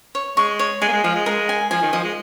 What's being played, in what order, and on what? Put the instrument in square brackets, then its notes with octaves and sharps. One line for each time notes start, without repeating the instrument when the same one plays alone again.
[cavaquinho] C#5
[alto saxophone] G#3 [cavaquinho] C#6
[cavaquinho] C#5
[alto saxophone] G#3 [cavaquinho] G#5
[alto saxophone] A#3
G#3
[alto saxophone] F3 [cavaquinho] F5
[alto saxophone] G#3
[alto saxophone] G#3 [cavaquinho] A#4
[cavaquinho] G#5
[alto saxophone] F3 [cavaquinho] G#5
[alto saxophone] D#3
[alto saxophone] F3 [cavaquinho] D#5
[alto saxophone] G#3